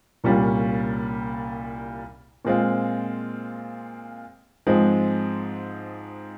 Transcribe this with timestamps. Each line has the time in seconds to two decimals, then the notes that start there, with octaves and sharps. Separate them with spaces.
0.24 C2 A#2 G3 C#4 F4
2.45 A#2 G#3 C4 F4
4.67 G#2 F3 G#3 C4